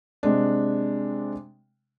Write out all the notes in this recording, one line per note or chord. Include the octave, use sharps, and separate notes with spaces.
C3 G#3 D4